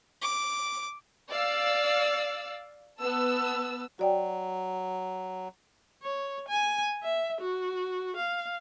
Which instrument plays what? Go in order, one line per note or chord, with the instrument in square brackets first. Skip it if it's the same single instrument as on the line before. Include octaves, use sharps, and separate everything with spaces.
[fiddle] D6
[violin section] D5 F5 E6
B3 A5 E6
[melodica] F#3 [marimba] F#4 D5 G5
[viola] C#5
G#5
E5
F#4
F5